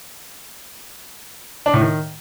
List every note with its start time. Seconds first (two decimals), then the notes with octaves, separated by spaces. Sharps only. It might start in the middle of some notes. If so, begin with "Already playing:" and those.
1.66 D4
1.74 A2
1.81 D#3